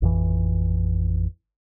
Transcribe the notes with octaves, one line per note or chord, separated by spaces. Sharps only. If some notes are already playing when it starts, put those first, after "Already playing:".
A1 F2 E3